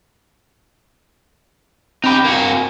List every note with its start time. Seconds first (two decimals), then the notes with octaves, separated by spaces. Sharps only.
2.04 C4 D#4 G4 B5
2.25 A#3 F#4